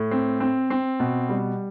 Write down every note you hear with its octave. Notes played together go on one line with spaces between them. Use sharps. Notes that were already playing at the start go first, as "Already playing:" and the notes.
Already playing: A2
C4
C4
C4
B2
G3